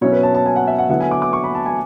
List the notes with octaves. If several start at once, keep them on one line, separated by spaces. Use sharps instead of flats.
B2 F#3 C#4 E4 C#5
B4
A5
A5
G#5
F#5
E5
F#5
D3 F#3 B3 E4 F#5
G#5
D6
D6
C#6
B5
A5
G#5